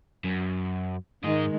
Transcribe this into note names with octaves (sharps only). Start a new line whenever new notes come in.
F#2
G#2 D#3 G#3 D#5